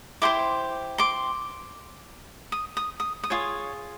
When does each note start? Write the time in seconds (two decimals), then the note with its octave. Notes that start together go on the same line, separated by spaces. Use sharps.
0.22 E4 G4 C5 C6 D6
0.98 C6 D6
2.52 D#6
2.77 D#6
3.00 D#6
3.24 D#6
3.30 F4 G#4 C#5